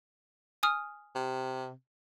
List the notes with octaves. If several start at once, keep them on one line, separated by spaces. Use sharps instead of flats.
G#5 D#6 F6
C3